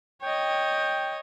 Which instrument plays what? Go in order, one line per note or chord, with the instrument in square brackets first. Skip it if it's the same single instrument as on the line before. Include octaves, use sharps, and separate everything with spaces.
[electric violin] C#5 D#5 [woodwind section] G5